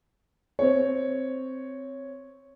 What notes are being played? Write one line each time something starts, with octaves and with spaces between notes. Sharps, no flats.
C4 C#5